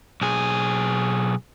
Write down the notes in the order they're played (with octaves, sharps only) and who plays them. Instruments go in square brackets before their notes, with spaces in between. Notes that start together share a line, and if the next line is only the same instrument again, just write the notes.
[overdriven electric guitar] B1 G#4